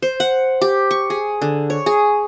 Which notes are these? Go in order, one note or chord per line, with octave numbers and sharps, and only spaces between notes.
C5
F#5
G4
C#6
G#4
D3
C#5
G#4